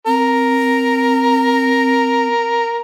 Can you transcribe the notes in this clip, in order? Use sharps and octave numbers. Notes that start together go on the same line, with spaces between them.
C4 A#4